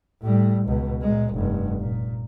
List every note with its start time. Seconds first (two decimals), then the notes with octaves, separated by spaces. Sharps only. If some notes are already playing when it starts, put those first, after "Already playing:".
0.22 A2 G3
0.67 C#2 B2
1.02 A#2 G#3
1.33 F1 G2
1.79 A#2